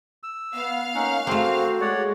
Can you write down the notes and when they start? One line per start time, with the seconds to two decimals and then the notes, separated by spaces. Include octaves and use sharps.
0.23 E6
0.54 B3 F5
0.95 A#3 C#4 D#4 F#5
1.27 A3 A#3 C4 F#4 C5
1.81 G#3 C#5 D5 F#5